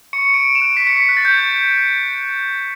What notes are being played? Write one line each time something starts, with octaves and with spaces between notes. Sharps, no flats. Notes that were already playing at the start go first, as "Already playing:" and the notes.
C#6 C#7
C#6 D7
C#6
E7
F#6
C#6 B6
C#7
C#6 B6
F#6 B6
A6
C#6 G6